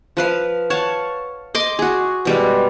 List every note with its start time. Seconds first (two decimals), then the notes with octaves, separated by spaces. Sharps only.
0.17 F3 B4 F5
0.70 C#5 F5 F#5 A5
1.55 D#5 C6 D6
1.79 F#4 G#4
2.25 B2 G3 G#3